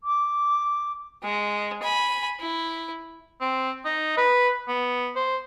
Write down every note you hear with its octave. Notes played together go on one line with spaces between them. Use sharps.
D6
G#3
G#5 B5
E4
C4
D#4
B4
B3
C5